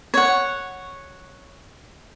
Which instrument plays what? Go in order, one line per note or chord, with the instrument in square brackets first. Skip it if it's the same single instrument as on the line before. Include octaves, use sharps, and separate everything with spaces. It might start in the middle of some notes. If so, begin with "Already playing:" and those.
[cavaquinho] C#5 F#5